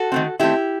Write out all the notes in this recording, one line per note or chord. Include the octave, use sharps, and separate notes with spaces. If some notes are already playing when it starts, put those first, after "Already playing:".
Already playing: F#4 A4
D#3 A3 C4
D#3 A3 C4 E4 G4